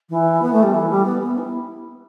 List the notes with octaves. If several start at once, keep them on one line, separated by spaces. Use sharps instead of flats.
E3
B3
A3
G3
E3
G3
B3
B3
E4